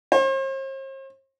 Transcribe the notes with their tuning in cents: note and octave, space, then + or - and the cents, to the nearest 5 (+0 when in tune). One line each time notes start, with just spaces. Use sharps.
C5 +45